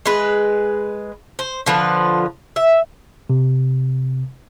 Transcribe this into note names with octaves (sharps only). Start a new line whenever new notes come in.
G#3 B4
C5
D3 F3 B4
E5
C3